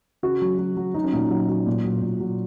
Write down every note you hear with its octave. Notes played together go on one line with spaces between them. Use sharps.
C#3 F#4
F#3
F#3
F#3
F#3 D#4
C#4
A#2 D#4
F#3 F#4
F#3
A#2
F#3
A#2
F#3